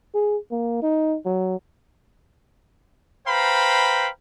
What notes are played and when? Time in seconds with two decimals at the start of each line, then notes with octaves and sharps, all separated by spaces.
0.14 G#4
0.51 A#3
0.82 D#4
1.25 F#3
3.27 B4 C5 F5 G5 A#5 B5